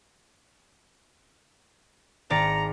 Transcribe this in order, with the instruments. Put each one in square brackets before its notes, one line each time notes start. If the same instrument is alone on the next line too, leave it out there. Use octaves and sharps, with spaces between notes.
[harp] G#1 D5 C#7 [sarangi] A#5